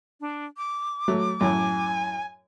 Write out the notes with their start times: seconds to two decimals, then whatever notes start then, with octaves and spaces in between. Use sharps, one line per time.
0.21 D4
0.57 D6
1.08 F#3 A3
1.41 F#2 A2 G#5